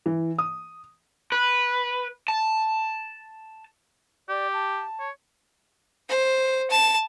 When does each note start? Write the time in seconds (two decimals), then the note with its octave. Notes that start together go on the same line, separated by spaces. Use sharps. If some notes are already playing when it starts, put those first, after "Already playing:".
0.06 E3
0.39 D#6
1.32 B4
2.28 A5
4.29 G4 D5
4.53 A5
5.00 C#5
6.09 C5
6.71 A5